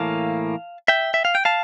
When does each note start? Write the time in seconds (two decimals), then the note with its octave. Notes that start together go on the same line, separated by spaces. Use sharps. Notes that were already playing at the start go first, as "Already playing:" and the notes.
Already playing: A2 E3 A#3 F5 A5
0.88 E5 G5
1.14 E5
1.25 F5
1.35 G5
1.45 F5 A5